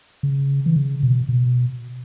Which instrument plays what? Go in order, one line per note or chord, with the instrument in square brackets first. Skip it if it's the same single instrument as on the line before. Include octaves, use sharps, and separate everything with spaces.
[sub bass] C#3
E3
C#3
B2
B2